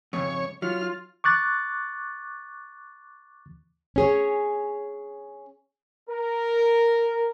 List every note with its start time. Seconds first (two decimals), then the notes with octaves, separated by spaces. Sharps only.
0.13 F2 G#2 C#3 C#5
0.62 F#3 F4 F6
1.24 C#6 D6 F#6 A6
3.96 C#4 G#4 C#5
6.10 A#4